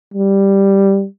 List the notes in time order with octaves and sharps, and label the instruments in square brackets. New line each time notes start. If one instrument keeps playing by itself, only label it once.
[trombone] G3